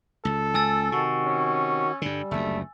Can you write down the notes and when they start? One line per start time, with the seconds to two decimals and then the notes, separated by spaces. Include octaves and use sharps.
0.25 C#2 A4
0.54 C#2 G#5 E6 A6
0.92 C3 D#3 F#4
1.25 C#4
2.02 G2 D3 G3
2.31 F#1 D2 A3